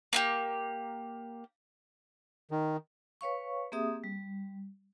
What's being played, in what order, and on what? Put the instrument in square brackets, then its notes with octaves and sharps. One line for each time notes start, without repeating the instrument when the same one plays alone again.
[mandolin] A#3 E4 G4
[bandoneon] D#3
[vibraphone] B4 C#5 F5 C#6
A#3 C4 G4 G#4 E5 D#6
G3